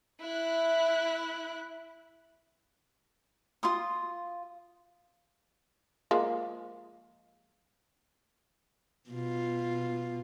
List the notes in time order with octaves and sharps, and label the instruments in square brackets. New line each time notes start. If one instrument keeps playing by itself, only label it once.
[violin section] E4 F#6
[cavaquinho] F4 C6 D#6
[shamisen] F3 G#3 A#3
[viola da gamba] B2 F4